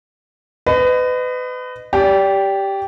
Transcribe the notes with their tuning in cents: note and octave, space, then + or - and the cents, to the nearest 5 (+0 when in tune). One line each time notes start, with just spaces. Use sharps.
B4 +30 D#5 -20
G4 +0 D5 -30